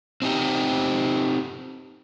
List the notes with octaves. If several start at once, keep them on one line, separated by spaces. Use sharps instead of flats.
C4 D#4 G4